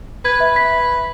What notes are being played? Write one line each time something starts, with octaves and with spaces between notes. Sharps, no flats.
B4 G#6
E5
B6